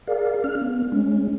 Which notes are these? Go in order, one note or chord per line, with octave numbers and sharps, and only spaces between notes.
G#4 A#4 D5 F5
C#4 F6
B3
G#3 C#4